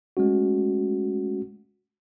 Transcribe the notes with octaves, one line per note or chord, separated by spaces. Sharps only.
G#3 A3 C#4 F#4